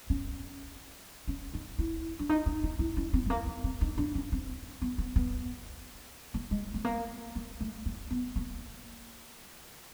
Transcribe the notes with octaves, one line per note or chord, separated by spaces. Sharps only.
C#4
C#4
D#4
E4
D4
D#4
D4
D#4
E4
C#4
C4
A3
A#3
B3
C4
D#4
D4
C#4
C4
B3
B3
B3
A#3
G#3
A3
A#3
A#3
A3
A#3
B3
A#3